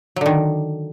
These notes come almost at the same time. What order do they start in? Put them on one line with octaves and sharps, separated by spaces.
F#3 D3 D#3